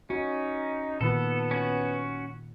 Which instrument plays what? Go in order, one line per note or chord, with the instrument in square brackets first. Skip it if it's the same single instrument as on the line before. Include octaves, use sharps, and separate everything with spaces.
[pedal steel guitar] C#4 [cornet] D#4 [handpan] F#4
[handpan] A#2 D#3 F4 [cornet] B3 [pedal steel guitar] A4
[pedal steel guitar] C#4 F#4